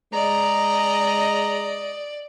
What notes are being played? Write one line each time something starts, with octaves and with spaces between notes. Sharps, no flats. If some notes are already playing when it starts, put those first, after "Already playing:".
G#3 D5 D#5 A#5